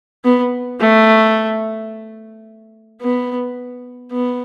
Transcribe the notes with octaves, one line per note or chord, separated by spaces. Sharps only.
B3
A3
B3
B3